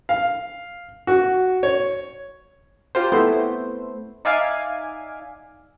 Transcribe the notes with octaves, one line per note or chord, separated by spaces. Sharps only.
F5
F#4
C#5
F4 G4 A#4 C5
A3 B3 C4 E4 C5
D#4 D5 E5 F5 G#5 D6